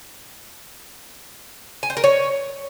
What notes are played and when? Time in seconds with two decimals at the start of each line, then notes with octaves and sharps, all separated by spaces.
1.83 G#5
1.90 C5
1.97 A#4
2.04 C#5